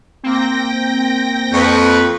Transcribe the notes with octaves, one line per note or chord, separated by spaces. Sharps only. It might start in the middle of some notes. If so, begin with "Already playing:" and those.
A#3 C4 G5 A#6
F2 B4 C#6